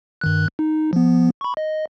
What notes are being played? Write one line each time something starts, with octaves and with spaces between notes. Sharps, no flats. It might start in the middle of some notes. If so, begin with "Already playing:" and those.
G2 D#3 F#6
D#4
F3 B3
B5 C#6
D#5